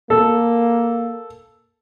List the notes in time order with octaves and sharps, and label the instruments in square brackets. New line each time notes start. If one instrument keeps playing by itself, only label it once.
[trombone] A#3 [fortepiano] A4